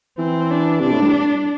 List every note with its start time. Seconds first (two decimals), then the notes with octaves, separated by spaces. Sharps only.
0.18 E3 C4
0.51 D4
0.81 C3 D4
0.91 A2
1.02 G2